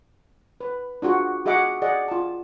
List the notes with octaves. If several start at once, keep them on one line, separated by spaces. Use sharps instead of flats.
B4
D4 F4 F#4 G#4
F#4 G#4 D#5 E5 F#5 D6
G#4 D5 D#5 F#5
F4 A5